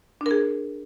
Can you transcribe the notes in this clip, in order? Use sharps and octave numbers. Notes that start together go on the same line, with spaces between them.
D4 G#4 A#4